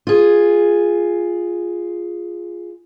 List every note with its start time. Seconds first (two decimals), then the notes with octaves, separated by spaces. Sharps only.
0.07 F4 G#4